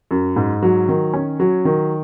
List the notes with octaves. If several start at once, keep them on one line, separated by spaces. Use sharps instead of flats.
F#2
G#2
F#3
D#3
C#4
F#3
D#3